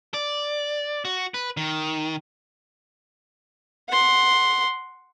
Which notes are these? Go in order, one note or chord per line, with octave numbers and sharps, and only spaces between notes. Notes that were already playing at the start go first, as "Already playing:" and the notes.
D5
F#4
B4
D#3
F#5 C6